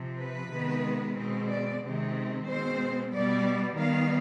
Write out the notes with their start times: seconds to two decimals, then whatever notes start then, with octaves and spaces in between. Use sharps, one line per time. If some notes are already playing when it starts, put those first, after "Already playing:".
Already playing: C3 F3 C4
0.19 B4
0.51 C3 D#3 G#3 B3
1.17 B2 G#3 C4
1.49 D5
1.82 C3 D#3 G#3 C4
2.47 B2 G#3 C4 C5
3.13 B2 G3 B3 D5
3.78 D#3 G3 B3 F5